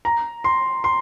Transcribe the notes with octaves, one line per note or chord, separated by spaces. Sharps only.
A#5
C6
C6